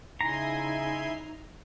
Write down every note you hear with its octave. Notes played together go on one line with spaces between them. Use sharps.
C#3 D#4 E4 G#5 A#5 C6